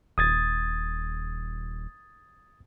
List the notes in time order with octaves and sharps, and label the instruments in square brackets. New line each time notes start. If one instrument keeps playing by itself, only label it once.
[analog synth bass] D#1 [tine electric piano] D#6 G#6 A6